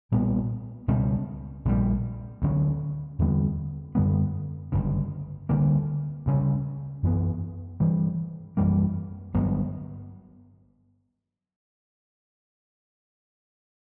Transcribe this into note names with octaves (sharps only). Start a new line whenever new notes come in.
B1 A#2 G3 B3
C#2 B2 G3 C#4
A#1 A#2 G3
D2 D3 F#3 C#4
E2 D3 G3 B3
F#2 D3 G3 B3
G1 F#2 C#3
D2 D3 G3 A#3
D2 C#3 G3 C#4
F#2 E3 B3
G2 E3 G3
F#2 E3 G3 A#3
G1 G2 F#3 B3